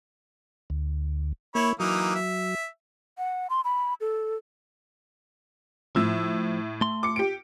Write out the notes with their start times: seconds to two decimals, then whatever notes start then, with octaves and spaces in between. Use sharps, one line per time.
0.70 D2
1.55 A#3 E4 C#5 B5
1.80 E3 F#3 A#3 D#4
2.15 E5
3.18 F#5
3.50 C6
3.64 B5
4.01 A4
5.96 A2 F3 E6
6.81 A3 C6
7.03 D6 C#7
7.16 G4 D7